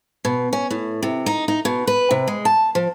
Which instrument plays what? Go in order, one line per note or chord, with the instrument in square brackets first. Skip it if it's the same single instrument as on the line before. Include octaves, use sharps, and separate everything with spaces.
[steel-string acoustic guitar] B2
C#4
A2
C3
D#4
D#4
B2
B4
C3
G#3
A5
F3